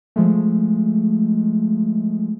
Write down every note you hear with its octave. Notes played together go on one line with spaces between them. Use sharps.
F3 G#3 A3